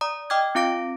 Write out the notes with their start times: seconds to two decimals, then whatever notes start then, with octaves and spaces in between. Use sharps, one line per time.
0.01 D5 A#5 D#6
0.30 D#5 G5 D6 F6 G#6
0.55 C4 F4 F5 D6 A#6 D7